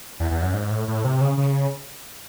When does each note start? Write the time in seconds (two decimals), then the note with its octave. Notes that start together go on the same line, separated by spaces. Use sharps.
0.20 E2
0.31 E2
0.43 F#2
0.54 G#2
0.71 A2
0.88 A2
1.04 C3
1.21 C#3
1.37 C#3